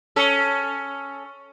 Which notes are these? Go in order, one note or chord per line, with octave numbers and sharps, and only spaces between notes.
C#4 A4